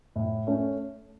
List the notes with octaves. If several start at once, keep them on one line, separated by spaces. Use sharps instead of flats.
A2
A3 C#4